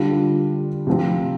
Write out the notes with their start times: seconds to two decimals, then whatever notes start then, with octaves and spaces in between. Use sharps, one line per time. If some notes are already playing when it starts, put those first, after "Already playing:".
Already playing: D3 G3 D4 F4
0.87 C3 F3 C4